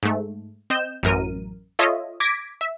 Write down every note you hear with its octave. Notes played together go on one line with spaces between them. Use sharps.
G#2 A3
C4 D#5 G6 E7
A1 F#2 A#4 D#7
F4 A4 C#5 D#5 E5
D6 G#6 A#6 B6 D7
E5